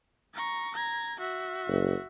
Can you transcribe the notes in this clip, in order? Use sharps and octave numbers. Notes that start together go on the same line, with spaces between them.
A#5 C#6
A#5 G#6
F#4 E5
F#1